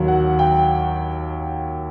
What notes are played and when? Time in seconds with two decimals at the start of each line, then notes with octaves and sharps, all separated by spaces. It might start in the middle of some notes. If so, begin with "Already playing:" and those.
Already playing: D#2 D#3 F#3
0.08 F#5
0.39 G5